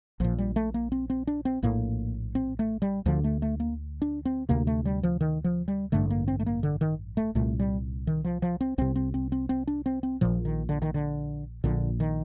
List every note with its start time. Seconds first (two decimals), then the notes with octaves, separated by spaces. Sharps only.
0.20 A#1 A#2 F3
0.38 G3
0.56 A3
0.74 A#3
0.92 C4
1.10 C4
1.27 D4
1.45 C4
1.63 A#1 A2 A#3
2.35 C4
2.59 A3
2.82 G3
3.06 D2 D3 F3
3.24 A3
3.42 A3
3.60 A#3
4.02 D4
4.25 C4
4.49 D2 C3 A#3
4.67 A3
4.85 G3
5.03 F3
5.21 D#3
5.44 F3
5.68 G3
5.92 A1 G2 D3 A3
6.10 A#3
6.28 C4
6.39 A3
6.46 A#3
6.63 D3
6.81 D#3
7.17 A3
7.35 C2 A#2 A3
7.59 G3
8.07 D#3
8.24 F3
8.42 F3
8.61 C4
8.78 C2 C3 C4
8.96 C4
9.14 C4
9.32 C4
9.49 C4
9.67 D4
9.86 C4
10.03 C4
10.21 A#1 A#2 F3
10.45 D#3
10.69 D3
10.82 D#3
10.94 D3
11.64 A#1 A#2 D3
12.00 D#3